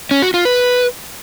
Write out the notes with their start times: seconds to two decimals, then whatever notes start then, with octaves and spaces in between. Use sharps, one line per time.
0.11 C#4
0.22 F#4
0.34 F4
0.45 B4